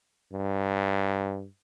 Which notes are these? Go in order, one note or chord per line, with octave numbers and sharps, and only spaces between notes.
G2